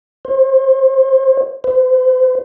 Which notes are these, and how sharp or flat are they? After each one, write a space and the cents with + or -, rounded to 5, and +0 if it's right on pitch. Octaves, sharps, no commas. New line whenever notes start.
C5 +25
C5 -35